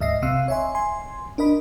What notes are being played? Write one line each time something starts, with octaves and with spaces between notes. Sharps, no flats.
D2 G#2 D#5 E5 A#6 C7
B1 C3 F5 E6 F#6 C7
C#5 D#5 E5 G#5 C6
G#5 C6
D4 A#4 D#5 B5